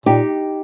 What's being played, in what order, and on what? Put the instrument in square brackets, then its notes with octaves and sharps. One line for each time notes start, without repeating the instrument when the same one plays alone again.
[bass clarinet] A#2 [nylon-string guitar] D#4 G4